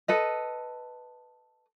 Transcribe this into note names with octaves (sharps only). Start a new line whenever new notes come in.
A4 B4 D#5